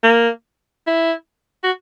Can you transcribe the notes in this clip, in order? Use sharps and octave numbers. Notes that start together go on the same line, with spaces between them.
A#3
E4
F#4